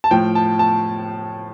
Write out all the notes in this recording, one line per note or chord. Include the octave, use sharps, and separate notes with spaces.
A5
A2 F3 G5
A5
A5